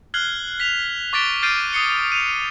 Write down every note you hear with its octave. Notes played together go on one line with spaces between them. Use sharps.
F6 F#6 G#6 C7 F#7 G7
B6 F7
C#6 D6 A6 B6 D7 G7
F6 G6 A6 C7 D7 D#7
D#6 C7 C#7 G7
D#7 F7